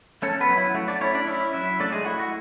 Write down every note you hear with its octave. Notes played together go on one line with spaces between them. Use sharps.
A3 C#4 A4
B3 B4
F#3
E4
A3 F#4
D4 D5
C#4 E4 C#5
D4 D5
C#4 E4 E5
F#3 E4 E5
A3 D4 D5
G#3 G#4
E4 F#4
F#4